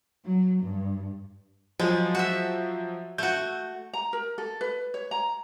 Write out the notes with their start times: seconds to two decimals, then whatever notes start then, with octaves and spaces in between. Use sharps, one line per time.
0.25 F#3
0.62 G2
1.79 F3 F#3 G#3
2.15 F#4 E5
3.18 A3 F#4 G6
3.93 A#5
4.13 A#4
4.38 A4
4.61 B4
4.94 C#5
5.11 A#5